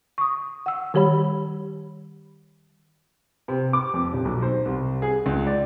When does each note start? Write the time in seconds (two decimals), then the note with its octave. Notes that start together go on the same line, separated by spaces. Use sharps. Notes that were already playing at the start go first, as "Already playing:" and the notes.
0.18 C#6 D#6
0.66 F#5 E6
0.94 D#3 G3 G4 C#5 B5
3.48 C3
3.73 D6
3.94 F2
4.13 D#1
4.25 B1
4.42 C5
4.65 C2
5.02 G#4
5.26 C#2
5.46 D5